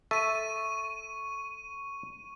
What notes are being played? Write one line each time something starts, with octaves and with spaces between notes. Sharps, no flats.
A4 E5 C#6 D#7